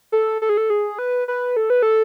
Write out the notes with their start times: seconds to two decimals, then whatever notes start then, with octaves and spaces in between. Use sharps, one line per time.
0.12 A4
0.42 A4
0.49 G#4
0.57 A4
0.70 G#4
0.99 B4
1.28 B4
1.57 A4
1.70 B4
1.83 A4